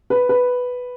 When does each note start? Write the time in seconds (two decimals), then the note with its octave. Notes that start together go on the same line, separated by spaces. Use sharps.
0.10 B4
0.29 B4